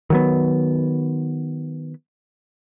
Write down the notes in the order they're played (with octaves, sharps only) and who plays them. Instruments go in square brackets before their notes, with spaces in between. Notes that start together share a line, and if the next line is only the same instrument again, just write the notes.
[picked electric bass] D#3 F#3 B3